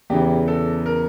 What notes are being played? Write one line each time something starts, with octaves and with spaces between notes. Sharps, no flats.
E2 C#3 E3 G4
A4
A#4